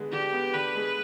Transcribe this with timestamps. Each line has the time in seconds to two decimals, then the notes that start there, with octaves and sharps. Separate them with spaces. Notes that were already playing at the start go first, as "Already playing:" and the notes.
Already playing: D3 G#3 B3
0.12 D3 G4
0.33 B3
0.53 D3 B4
0.75 G#3